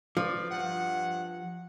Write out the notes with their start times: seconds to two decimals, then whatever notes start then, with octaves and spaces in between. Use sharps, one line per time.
0.17 F3 B4 D5
0.51 G2 F#5